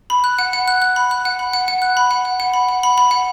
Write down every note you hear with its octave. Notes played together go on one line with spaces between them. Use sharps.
B5
F#6
F#5
F#5
F#6
F#6
B5
F#6
F#5
B5
F#5
F#5
F#6
B5
F#5
F#5
F#5
B5
F#5
B5
B5
F#5